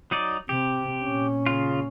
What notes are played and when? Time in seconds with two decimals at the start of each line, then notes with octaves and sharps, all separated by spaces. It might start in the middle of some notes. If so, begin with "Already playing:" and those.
0.11 F#3 D#4 D5
0.49 C3 G4
1.03 A#2 C#4
1.46 C#3 F4